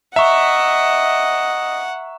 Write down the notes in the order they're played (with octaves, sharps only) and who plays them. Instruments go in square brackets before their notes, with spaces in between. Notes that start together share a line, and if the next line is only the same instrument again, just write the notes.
[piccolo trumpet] D#5 [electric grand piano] E5 [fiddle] F#5 [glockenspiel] A#5 C#6